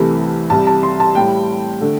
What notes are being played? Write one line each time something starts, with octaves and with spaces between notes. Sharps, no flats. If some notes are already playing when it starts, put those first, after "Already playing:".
Already playing: C2 C3 E3 A3 A5
C2 C3 G3 A5
A5
C6
A5
A2 G3 G5
D3 A3